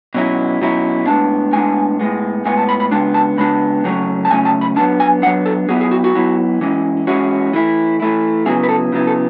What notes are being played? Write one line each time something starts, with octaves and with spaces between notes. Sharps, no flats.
B2 F#3 C#4 E4
B2 F#3 C#4 E4
A2 G#3 B3 D4 A5
A2 G#3 B3 D4 G#5
A2 G#3 B3
A2 G#3 B3 G#5
A5
B5
B5
C#3 G#3 B3 D4 A5
A5
C#3 G#3 B3 D4 B5
C#3 F#3 A3 C#4
A5
C#3 F#3 A3 C#4 G#5
A5
B5
F#3 B3 D4 A5
G#5
F#3 B3 D4 F#5
A4
F#3 B3 E4 G#4
G#4
F#4
F#4
F#3 B3 E4
E3 G#3 C#4 E4
E3 G#3 C#4 E4 F#4
E3 A3 E4
E3 A3 E4
C#3 F#3 B3 E4 G#4
B4
A4
C#3 F#3 B3 E4
A4